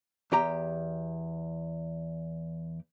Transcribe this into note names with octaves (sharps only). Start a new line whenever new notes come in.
E2 G4 A#5